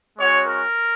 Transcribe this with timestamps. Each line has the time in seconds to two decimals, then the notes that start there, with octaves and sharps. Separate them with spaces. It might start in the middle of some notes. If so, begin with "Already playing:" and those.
0.18 G#3 C#4 F#4 C#5
0.46 A#4